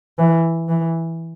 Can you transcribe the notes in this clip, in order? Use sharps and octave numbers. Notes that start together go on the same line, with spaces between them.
E3
E3